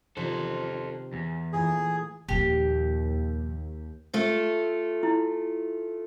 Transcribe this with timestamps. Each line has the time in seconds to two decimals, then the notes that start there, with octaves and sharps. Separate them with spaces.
0.17 C3 D#3 F3 A4 C5
1.13 E2
1.53 A#2 E3 A3 G#4
2.29 D#2 A#2 F3 G4
4.13 A3 F4 A4
5.03 E4